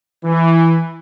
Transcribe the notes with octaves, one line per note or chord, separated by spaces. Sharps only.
E3